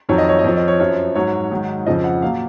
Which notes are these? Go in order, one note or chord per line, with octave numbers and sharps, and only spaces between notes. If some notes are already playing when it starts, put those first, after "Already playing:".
F2 D#3 F#3 C#5
D#5
C#5
D#5
F2 F3 C#5
D#5
C#5
F#2 F3 C#5
G#2 F#3 C#5
G#2 D#3 F#3
F2 C#3 F3 D#5
F#5
A#2 F#3 F5